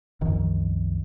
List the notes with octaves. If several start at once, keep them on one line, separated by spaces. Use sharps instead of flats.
C2 F#2 D#3 F3